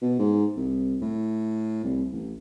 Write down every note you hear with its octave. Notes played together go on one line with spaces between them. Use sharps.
B2
G#2
C2
A2
C2
A1